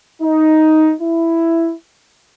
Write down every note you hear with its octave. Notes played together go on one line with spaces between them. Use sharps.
D#4
E4